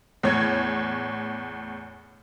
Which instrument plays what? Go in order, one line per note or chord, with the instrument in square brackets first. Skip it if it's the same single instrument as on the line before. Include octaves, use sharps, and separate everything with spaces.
[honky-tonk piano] E2 A2 C#5 G#6